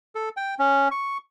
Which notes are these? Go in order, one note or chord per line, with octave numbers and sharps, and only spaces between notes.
A4
G5
C#4
C#6